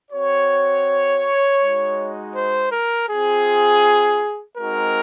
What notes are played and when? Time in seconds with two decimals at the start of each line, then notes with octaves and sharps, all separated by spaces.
0.11 C4 F#4 C#5
1.61 G#3 D#4 F#4
2.36 C5
2.72 A#4
3.10 C4 F4 G#4
4.58 G#3 C4 D#4 F#4 A#4